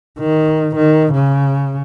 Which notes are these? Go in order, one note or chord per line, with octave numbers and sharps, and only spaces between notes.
D#3
D#3
C#3